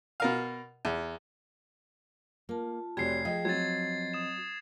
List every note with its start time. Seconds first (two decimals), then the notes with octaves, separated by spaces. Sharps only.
0.20 B2 A#4 F5
0.85 E2
2.49 A#3 F4 A5
2.97 F1 C4 F#4 G4 C#5 D5 G#6 C7
3.25 F3 G#4 D#5 G5
3.45 F#3 C4 D#5 G#6 A6
4.14 D#6 E7